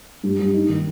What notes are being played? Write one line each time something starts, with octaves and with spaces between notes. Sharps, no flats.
G2
G2
D#4
D#3